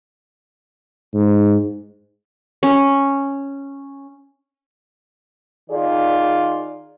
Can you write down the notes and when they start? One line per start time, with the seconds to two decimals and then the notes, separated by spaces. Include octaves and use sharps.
1.14 G#2
2.63 C#4
5.70 D#3 F4 G#4 D5